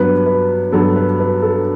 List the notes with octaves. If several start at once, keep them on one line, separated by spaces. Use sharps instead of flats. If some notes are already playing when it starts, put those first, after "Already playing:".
Already playing: G2 F#3 B3 B4
B4
G2 F#3 B3 A4
B4
B4
A4